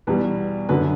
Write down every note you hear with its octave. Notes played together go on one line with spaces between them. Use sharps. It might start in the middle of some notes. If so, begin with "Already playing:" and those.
E2 B2 G3 B4
F#2 D3 F#3 B4